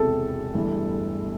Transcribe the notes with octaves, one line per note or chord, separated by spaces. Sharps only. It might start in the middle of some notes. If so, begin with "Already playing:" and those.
Already playing: E1 E2 C3 A4
G1 G2 E3 A3